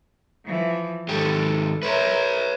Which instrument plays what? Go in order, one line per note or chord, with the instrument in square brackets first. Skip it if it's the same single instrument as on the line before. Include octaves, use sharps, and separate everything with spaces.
[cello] E3 F3
[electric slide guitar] G#2 D#3 G4 [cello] A4
[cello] A#4 E5 [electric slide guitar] B4 C#5